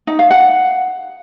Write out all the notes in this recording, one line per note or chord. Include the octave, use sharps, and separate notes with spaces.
D#4
F5
F#5